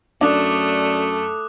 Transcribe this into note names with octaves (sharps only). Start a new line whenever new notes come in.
F#2 A3 D4 D6 D#6 F#6